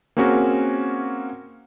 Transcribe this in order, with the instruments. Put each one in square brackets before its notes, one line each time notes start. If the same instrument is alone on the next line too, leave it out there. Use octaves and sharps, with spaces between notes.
[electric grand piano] A#3 C4 C#4 F#4 G#4 A#4